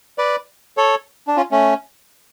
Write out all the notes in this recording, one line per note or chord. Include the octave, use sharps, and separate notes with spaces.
B4 D5
A4 C#5
D4
C#4 F4
A3 C#4